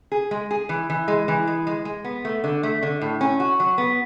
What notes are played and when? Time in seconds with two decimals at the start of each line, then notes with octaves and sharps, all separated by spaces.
0.12 G#4
0.31 G#3
0.51 G#4
0.69 E3
0.90 E3
1.08 G#3
1.28 E3
1.47 G#3
1.67 G#3
1.85 G#3
2.05 B3
2.25 A3
2.44 D3
2.63 A3
2.83 D3
3.01 A2
3.21 C#4
3.40 F#4
3.60 F#3
3.78 B3